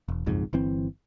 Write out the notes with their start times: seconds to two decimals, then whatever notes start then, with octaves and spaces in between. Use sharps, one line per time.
0.08 E1
0.26 F#1 B1 F2 G#2
0.53 G1 E3 C4